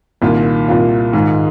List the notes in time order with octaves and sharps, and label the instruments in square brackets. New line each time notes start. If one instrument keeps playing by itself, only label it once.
[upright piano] C2 A#2 A#3 F4 [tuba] D#3
[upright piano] C2 A#2 A#3 F4
[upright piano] G#2 G#3 F4 [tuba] D#3